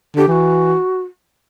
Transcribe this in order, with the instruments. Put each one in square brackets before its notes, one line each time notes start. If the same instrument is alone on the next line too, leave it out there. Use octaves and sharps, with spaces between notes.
[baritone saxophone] D3 [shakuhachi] G4
[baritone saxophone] E3 [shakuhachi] F#4 G4